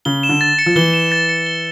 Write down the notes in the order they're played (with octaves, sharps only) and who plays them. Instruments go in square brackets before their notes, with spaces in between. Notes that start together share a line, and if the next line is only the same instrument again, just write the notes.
[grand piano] C#3 [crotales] G7
[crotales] E7
[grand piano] D3
[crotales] A6
C#7
[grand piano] F3
[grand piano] E3 [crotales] G7
[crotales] E7
A6
C#7
G7